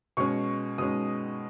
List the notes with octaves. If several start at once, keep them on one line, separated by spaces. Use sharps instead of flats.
B2 G#3 C#4 C#6
B2 G#3 C#4 D#6